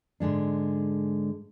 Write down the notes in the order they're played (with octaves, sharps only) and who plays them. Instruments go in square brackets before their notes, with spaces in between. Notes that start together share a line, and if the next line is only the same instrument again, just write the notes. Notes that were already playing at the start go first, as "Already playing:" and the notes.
[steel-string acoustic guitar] G#2 D3 G#3 D4